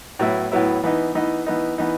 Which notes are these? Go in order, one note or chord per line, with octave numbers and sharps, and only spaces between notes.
A2 F#3 B3 E4
A2 F#3 B3 E4
E3 B3 D#4
E3 B3 D#4
E3 B3 D#4
E3 B3 D#4